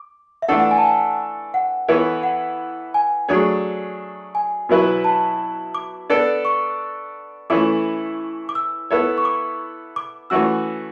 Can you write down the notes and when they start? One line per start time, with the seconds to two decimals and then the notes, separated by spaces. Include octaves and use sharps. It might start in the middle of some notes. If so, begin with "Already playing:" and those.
Already playing: D6
0.42 E5
0.48 E3 A3 D4 A4 F#5
0.59 F#5
0.71 G#5
0.78 A5
0.83 G#5
1.54 F#5
1.88 E3 B3 E4 A4 C#5
2.23 F#5
2.94 G#5
3.29 F#3 A3 D4 G#4 C#5
4.35 G#5
4.69 B2 F#3 B3 E4 B4
5.04 A5
5.75 D6
6.10 B3 D4 A4 D5
6.45 C#6
7.50 E3 A3 C#4 E4 A4 D6
8.49 D6
8.55 E6
8.91 B3 E4 A4 C#5
9.18 C#6
9.25 D6
9.96 D6
10.30 E3 A3 C#4 F#4 E6